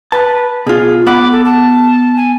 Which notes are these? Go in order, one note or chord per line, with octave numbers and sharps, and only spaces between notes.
B4 A5
B2 F4 G#4
B3 F#5 B5 D6
A4
A5
G#5